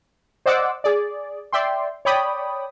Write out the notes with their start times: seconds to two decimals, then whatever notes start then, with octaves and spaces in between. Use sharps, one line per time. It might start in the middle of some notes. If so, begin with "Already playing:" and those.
0.46 C5 D5 D#5 F#5 D6 E6
0.84 G#4 D5
1.53 D5 E5 G5 C6
2.05 C#5 D5 G5 B5 D#6